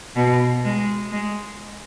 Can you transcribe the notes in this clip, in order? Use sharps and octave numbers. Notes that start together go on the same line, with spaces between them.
B2
G#3
G#3